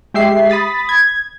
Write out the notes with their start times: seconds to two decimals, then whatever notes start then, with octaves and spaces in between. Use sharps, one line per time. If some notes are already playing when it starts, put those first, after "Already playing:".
0.14 G#3 G4 E5 C7
0.50 B5 D#6 A6 B6
0.89 G#6